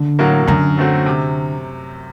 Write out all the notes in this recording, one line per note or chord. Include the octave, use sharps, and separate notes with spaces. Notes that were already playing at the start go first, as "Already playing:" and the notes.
Already playing: D3
A2 F#3 A#3 F#4
F#2 D3
F#3 A3 C4 F#4
C3